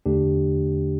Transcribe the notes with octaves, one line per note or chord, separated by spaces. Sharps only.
E2 D3 A3 D4 G4